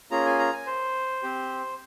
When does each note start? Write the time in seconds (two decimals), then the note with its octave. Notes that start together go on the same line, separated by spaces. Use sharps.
0.11 A#3 C#4 F4 G#4 A#5
0.26 G#5
0.39 A#5
0.53 G#5
0.67 C5
1.22 C4 G4